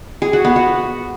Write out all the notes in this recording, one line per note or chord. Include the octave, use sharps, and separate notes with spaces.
G#4
F#4
B3
F#4